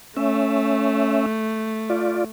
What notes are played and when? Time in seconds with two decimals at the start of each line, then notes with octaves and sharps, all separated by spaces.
0.17 A3 C#4 E5
1.90 F4 D5